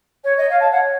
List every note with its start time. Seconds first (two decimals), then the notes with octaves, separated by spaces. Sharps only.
0.23 C#5
0.36 D#5
0.48 C#5 F5
0.60 A5
0.70 C#5 F#5